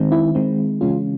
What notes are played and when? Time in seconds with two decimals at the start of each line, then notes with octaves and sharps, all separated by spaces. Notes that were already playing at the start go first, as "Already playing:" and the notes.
Already playing: D#3 G#3 C4
0.12 E4
0.35 D#3 G#3 C4
0.81 C#3 E3 G#3 C#4 F4